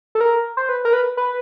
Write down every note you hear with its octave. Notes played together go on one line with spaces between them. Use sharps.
A4
A#4
C5
B4
A#4
B4
B4